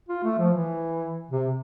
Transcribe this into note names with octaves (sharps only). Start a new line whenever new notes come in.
F4
A3
F3
E3
C3